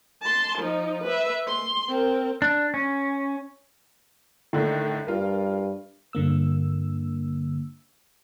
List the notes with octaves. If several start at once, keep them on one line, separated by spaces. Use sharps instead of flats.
A5 C6
F3 D#4
B4 E5
C6
C4 A#4
D4
C#4
A2 D3 D#3
G2 F4 A#4
G2 D3 A#3 E6